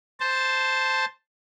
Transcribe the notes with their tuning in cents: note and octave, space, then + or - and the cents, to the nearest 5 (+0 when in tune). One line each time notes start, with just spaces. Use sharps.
C5 +0 A5 +0